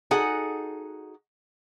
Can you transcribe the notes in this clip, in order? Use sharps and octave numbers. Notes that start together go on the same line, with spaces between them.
D#4 F#4 G#4 A4 F#5